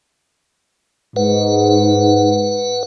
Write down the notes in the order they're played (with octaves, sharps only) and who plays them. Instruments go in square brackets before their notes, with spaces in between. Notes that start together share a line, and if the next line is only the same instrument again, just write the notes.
[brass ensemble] G#2 [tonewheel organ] B4 F#5